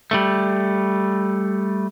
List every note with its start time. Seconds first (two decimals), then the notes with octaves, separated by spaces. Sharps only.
0.11 G3 A3